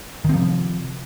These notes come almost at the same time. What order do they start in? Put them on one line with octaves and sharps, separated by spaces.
D#3 C4 F3 C3